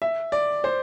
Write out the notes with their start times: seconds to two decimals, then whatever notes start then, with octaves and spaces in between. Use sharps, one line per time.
0.02 E5
0.32 D5
0.64 C5